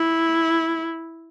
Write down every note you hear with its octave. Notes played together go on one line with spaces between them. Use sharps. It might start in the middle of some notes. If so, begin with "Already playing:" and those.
Already playing: E4